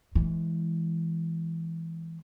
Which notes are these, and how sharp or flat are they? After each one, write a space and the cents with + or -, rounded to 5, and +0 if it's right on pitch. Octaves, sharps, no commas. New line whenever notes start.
E3 +0 G#3 +10